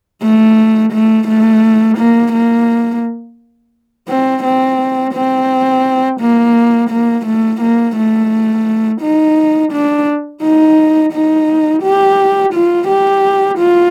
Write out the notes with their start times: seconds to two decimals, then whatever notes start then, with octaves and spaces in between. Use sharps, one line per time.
0.22 A3
0.93 A3
1.28 A3
1.98 A#3
2.33 A#3
4.09 C4
4.44 C4
5.14 C4
6.21 A#3
6.90 A#3
7.26 A3
7.61 A#3
7.97 A3
9.02 D#4
9.72 D4
10.43 D#4
11.13 D#4
11.83 G4
12.54 F4
12.88 G4
13.59 F4